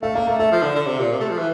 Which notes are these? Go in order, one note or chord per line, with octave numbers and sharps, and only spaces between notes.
A3 F5
A#3 F5
A3 E5
A3 E5
F3
D3
D3
C3
A#2
C3
A3
F3
E3